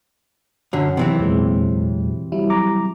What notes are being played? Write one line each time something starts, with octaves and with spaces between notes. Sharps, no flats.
F#2 D3 F#3
C3 D#3 E3 C4
E2 A#2 G#3
F#3 G3 E4
A#5 D6